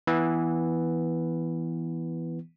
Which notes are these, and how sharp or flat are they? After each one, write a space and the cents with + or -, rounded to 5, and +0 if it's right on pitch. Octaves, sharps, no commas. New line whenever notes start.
E3 +0 B3 +0